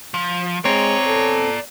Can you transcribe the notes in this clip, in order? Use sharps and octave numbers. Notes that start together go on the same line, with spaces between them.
F3
G#3 C4 C#5 D5 A#5
A4